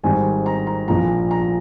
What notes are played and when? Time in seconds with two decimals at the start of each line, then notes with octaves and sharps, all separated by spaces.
0.04 G#1 G#2 G3 C4 G#5
0.46 A#5
0.67 A#5
0.88 A#1 A#2 F3 A#5
1.31 A#5